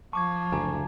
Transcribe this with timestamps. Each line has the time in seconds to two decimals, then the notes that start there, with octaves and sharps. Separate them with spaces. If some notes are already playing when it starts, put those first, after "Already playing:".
0.13 F3 A5 C#6 D6 G#6
0.52 F#1 D2 G#5 A#5 D6